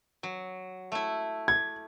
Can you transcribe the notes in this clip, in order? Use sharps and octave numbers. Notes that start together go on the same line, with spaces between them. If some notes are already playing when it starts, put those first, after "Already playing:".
F#3
A3 E4
G#6